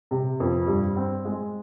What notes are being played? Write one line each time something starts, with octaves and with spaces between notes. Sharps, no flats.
C3
F2
G2
C4
G#3